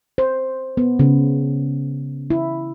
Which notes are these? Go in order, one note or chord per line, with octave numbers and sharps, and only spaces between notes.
C5
B3
C#3
E4